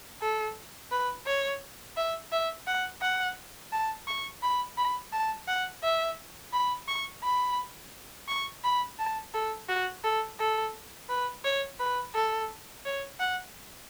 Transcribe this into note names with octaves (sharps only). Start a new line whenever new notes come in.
A4
B4
C#5
E5
E5
F#5
F#5
A5
C#6
B5
B5
A5
F#5
E5
B5
C#6
B5
C#6
B5
A5
A4
F#4
A4
A4
B4
C#5
B4
A4
C#5
F#5